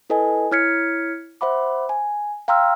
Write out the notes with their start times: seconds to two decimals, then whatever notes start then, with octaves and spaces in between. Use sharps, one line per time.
0.10 E4 A4 B4 D#5 G#5
0.52 E4 C#5 F6 G#6 B6 C#7
1.41 C5 E5 F#5 B5 D6
1.89 G#5
2.48 F5 G5 A#5 C6 E6 F6